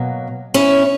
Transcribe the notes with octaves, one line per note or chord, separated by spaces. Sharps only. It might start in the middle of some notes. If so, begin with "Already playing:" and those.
Already playing: B2 F#3 A#3
C#4 E4